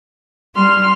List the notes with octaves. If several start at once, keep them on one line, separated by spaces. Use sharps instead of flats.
G3 C6 F6